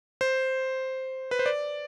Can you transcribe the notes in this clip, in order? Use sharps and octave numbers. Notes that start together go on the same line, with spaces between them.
C5
B4
C5
D5